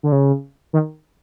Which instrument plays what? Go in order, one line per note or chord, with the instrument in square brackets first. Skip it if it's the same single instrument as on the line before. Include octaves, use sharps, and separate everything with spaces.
[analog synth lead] D3
C#3
D#3